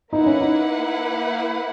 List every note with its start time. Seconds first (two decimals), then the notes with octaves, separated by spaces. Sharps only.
0.13 A#3 D#4 E4 B4 F#5
0.26 C#4
0.41 D#4